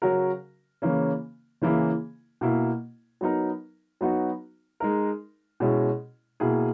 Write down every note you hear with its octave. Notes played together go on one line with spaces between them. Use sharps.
C#3 F#3 C#4 F#4 A#4
C#3 E3 A#3 C#4
C#3 E3 A#3 E4 G#4
B2 A#3 E4
F#3 B3 D#4 A#4
F#3 B3 D#4 F#4
G#3 D#4 A#4
B2 G#3 C#4 E4 G#4
B2 A#3 E4 G#4